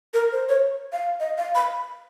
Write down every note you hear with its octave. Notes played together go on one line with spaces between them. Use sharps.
A#4
C5
C#5
F5
D#5
F5
B5